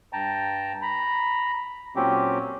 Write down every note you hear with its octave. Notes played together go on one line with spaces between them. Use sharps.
G2 G5 A5 A#5
A#5 B5
A#2 F#3 C4 C#4 G4